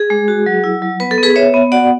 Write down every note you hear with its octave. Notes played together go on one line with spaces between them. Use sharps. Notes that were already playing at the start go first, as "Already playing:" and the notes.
Already playing: G#4
G#3
F#4
F#3
E4
F#3
B3 B4
A4
B3
G#4 B4
B3 C#5 E5
B3
F#4 D5 F#5